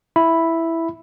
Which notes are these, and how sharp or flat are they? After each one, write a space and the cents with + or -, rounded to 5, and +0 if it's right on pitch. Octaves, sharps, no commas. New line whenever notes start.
E4 +0 B5 +0